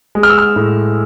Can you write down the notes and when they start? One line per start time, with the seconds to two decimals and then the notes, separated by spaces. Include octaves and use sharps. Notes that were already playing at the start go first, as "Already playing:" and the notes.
0.15 G#3
0.23 F6
0.30 E6
0.38 F6
0.56 A2